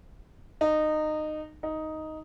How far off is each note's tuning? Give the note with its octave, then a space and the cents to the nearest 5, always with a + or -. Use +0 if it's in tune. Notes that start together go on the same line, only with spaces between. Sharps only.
D#4 -20
D#4 +5